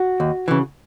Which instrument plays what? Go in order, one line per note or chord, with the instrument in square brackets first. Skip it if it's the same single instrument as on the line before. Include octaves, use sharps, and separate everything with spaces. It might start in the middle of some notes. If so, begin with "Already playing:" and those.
Already playing: [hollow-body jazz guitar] F#4
D#2
C#3 E3